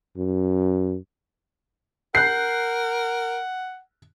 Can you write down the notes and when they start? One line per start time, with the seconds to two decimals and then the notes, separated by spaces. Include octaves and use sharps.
0.17 F#2
2.15 A#4 F#5 F#6 G6 C7